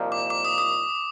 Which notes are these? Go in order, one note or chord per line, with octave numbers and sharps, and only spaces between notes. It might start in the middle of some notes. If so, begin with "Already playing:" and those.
Already playing: C2 A#2 F3 A#3 D#4
D6
D6
D#6
D#6